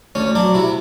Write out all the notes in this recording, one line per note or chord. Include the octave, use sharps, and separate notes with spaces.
D2 C#4
F#3 D4
C3 E4